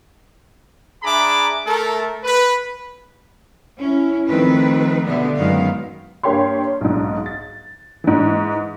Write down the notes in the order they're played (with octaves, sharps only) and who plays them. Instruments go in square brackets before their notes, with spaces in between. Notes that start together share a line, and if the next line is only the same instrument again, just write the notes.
[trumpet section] D4 G#4 E5 A#5 B5 D6
A3 A4 A#4
B4
[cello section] C#4 E4
D#3 F3 A3 C4 B4
B2 D3 G3 B3 E5
F#2 D#3 G#3 B3 F5
[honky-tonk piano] G2 A#3 G4 C#5 C6
B1 G#2
A6
G#2 E3